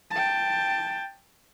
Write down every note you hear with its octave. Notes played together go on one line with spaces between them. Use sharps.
G5 A5